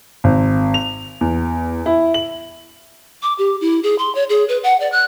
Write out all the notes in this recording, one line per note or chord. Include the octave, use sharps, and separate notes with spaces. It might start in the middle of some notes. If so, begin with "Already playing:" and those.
G#1
F7
E2
E4
F#7
D6
G4
E4
G#4
C6
C#5
G#4
B4
F#5
D5
F#6